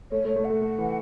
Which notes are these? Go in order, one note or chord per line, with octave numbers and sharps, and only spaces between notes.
A3 C#5
A3
C#5
A3
F#5
A3
A3
E3